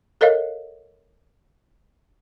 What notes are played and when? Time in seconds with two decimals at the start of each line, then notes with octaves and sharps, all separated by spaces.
0.21 A4 A#4 C#5 D#5 F5